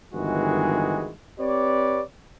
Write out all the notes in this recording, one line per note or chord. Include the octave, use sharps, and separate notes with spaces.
G1 D#3 E3 G#3 F#4 G#4
C4 G4 B4 C#5 D5